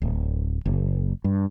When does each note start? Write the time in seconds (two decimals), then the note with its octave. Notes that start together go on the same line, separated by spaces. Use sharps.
0.02 D1
0.66 F#1
1.24 G2